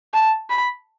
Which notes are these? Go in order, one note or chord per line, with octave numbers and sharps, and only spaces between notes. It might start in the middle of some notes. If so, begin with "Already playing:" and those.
A5
B5